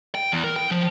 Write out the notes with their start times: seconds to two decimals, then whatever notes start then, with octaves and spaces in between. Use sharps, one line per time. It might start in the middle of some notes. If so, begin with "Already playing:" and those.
0.15 G5
0.32 E2
0.44 A#4
0.56 G5
0.71 F3